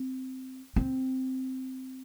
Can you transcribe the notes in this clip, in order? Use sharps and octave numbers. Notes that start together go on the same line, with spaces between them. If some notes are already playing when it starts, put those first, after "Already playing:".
Already playing: C4
C4